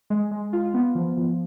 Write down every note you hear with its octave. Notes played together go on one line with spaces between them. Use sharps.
G#3
G#3
F4
B3
F3
F3